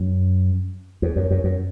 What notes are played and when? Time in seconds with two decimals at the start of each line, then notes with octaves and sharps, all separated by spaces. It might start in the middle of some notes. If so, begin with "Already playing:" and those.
Already playing: F#2
1.02 E2
1.16 F#2
1.31 F#2
1.44 F#2